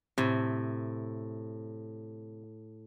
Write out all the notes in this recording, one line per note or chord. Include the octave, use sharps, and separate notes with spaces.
A2 C3